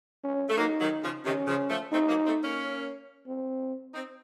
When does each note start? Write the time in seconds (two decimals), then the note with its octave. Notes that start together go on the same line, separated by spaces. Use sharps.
0.24 C#4
0.49 A3
0.58 F#3 A#3 D#4
0.80 D#3 F#3
1.02 C#3 F3
1.24 C3 D#3 C#4
1.47 C#3 F3
1.69 F3 A3
1.92 A3 C4 D#4
2.09 F#3 A#3
2.25 A3 C4
2.43 A#3 C#4
3.27 C4
3.93 C4 D#4